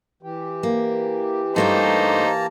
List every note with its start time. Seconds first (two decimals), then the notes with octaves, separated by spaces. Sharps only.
0.23 E3 G4
0.63 A#3
1.56 G2 A3 A#3 D#4 C5 G5 A5 A#5